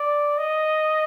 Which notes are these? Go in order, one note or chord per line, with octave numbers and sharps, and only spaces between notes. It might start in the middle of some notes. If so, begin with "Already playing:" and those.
Already playing: D5
D#5